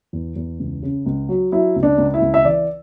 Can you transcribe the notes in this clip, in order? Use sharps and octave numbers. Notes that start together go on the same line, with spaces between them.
E2
E2
C#2
C#3
C#2
F#3
F#3 E4
C#2
D4
C#2
E4
C#2
E5
E3 D5